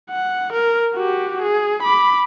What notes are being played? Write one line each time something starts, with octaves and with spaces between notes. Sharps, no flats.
F#5
A#4
F#4 G4
G#4
B5 D6